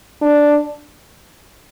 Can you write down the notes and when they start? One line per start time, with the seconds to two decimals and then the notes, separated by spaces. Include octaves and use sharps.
0.22 D4